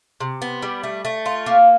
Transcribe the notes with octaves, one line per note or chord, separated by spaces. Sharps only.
C3
B3
G3
A3
A3
F4
A#3